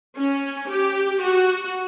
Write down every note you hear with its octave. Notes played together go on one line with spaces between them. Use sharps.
C#4
G4
F#4